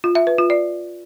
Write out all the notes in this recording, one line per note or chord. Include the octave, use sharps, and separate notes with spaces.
F4
E5
B4
F4
D5